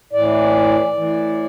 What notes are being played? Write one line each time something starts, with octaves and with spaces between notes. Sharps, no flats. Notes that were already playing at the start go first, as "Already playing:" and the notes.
A2 E3 D5
A2 E3